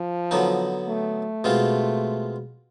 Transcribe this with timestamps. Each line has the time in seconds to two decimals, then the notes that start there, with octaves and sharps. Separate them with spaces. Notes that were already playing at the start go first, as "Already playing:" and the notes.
Already playing: F3
0.31 D3 F#3 B3 D#4
0.88 A3
1.44 B2 G#3 C4 F4